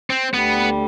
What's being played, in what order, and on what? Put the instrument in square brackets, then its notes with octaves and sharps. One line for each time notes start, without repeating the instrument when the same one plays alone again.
[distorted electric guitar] C4
[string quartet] D2 D3 G3 [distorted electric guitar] B3